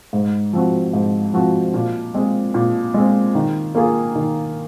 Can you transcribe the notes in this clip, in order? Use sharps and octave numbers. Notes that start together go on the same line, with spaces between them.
G#2
F3 C4 F#4
G#2
F3 C4 F#4
A#2
G#3 C4
A#2
G#3 C4
D#3
A#3 F4 G#4
D#3